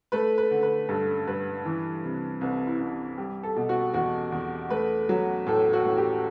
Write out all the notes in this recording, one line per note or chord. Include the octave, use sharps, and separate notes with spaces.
A3 B4
B4
D3
B4
G2 A4
G2 B4
E3
C3
C2 B4
E4
C2
G3 G4
A4
B2
F#4
E2 F#4
E2
A3 B4
F#3
A2 A4
F#4
A2
G4